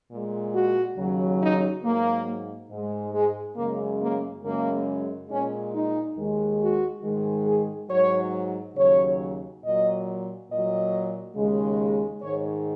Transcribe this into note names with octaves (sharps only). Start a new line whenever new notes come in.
A#2 G#3
F#4
D#2 C#3 F#3
D#4
G#2 F#3 A#3
G#2 G#3
G#3
F#2 C#3 G#3 A#3
A#3
F#2 C#3 G#3 A#3
A#2 G#3 C#4
D#4
D#2 D#3 G#3
F#4
G#2 D#3 G#3
G#4
G#2 F#3 C#5
D#2 C#3 F#3 C#5
A#2 F#3 D#5
A#2 F#3 D#5
D#2 C#3 G#3
G#2 D#3 G#3 C#5